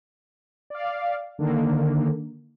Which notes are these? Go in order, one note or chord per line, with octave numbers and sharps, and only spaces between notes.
D5 F5
D3 D#3 A#3